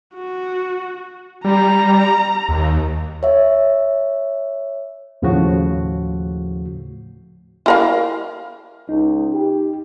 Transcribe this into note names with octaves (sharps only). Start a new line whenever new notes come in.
F#4
G3 A#5
D#2
C#5 E5
D#2 A2 C#3 F3 A3 F#4
E4 A#4 F5
C#2 D#4
G4